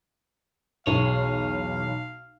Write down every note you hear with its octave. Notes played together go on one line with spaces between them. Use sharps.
B1 E2 G#4 C#5 F5